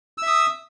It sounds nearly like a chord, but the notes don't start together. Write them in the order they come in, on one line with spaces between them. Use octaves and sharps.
E6 E5 D#6